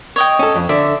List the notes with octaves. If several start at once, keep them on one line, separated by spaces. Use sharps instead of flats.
C#5 D#5 G5
C#4 A4
F2
D3 D5 E5